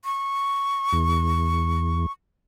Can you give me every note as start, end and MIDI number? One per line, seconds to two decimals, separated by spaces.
0.05 2.12 85
0.93 2.06 40